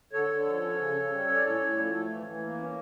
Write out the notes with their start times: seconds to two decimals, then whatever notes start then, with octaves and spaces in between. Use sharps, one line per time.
0.13 D3 A4 C#5
0.30 D3
0.46 F3
0.62 C#4
0.79 C#3
0.95 C#3
1.11 G3
1.28 C#4
1.34 D5
1.44 A2 A4 C#5
1.60 A2
1.77 F3
1.93 A3
2.09 E3
2.26 E3
2.43 A#3
2.59 C#4